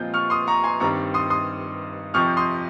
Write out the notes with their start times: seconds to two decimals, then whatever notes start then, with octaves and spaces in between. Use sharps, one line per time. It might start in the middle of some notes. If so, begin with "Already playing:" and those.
Already playing: A#2 F3 G#3 C4 F4 G6
0.14 C#6 F6
0.30 C6 D#6
0.47 A#5 C#6
0.64 G#5 C6
0.80 G2 D#3 G3 C4 D#4 A#5 C#6
1.14 C6 D#6
1.30 C6 D#6
2.14 F2 C3 F3 C#6 F6
2.37 C6 D#6